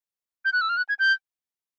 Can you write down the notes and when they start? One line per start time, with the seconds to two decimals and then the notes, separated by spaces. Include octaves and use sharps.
0.45 G6
0.53 F#6
0.61 E6
0.69 F6
0.77 F#6
0.89 G#6
0.99 G6